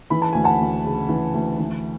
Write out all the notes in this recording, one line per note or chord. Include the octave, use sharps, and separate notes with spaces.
E3 B5
A5
D2 G#5
F#5 A5
D2
C#3
E3
D2
E3